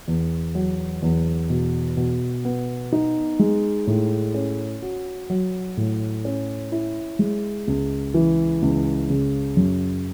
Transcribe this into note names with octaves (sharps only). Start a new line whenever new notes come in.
E2
F#3
E2
B2
B2
B3
D#4
G#3
A2
C#4
F#4
F#3
A2
C#4
E4
G#3
C#2
E3
C#2
C#3
F#2